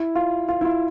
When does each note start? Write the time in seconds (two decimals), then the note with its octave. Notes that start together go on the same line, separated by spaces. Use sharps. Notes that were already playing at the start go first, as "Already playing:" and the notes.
Already playing: E4
0.15 F4
0.49 F4
0.61 E4
0.65 F4